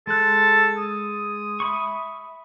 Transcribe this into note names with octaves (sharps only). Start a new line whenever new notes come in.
G#3 A4 F#6
D#6
E5 B5 C#6